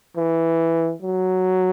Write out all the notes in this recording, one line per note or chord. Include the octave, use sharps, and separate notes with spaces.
E3
F#3